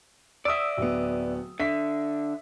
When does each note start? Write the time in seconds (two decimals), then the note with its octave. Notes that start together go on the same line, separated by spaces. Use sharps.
0.45 D5 E5 D#6 E6
0.77 D1 B3
1.60 D3 E5 B6